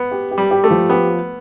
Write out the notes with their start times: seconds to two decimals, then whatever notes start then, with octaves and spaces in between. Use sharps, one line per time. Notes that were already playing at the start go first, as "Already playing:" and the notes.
Already playing: B3
0.11 G4
0.31 G4
0.38 G3
0.51 G4
0.64 A3
0.71 F3
0.90 B3 G4